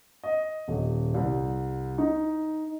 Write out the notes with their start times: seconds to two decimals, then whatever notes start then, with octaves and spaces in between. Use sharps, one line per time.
0.24 D#5
0.68 D#1
1.14 C2
1.98 D#4